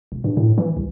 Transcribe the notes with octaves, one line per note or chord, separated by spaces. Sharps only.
E1
G2
A2
E3
C2